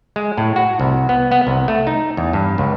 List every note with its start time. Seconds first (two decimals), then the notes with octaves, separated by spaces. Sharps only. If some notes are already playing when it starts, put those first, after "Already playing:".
0.16 G#3
0.37 A2
0.56 F#4
0.80 C2
1.09 B3
1.31 B3
1.47 C2
1.68 A3
1.87 D#4
2.17 E2
2.33 G2
2.58 C#2